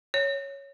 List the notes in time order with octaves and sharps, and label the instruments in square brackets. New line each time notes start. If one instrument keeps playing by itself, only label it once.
[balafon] C#5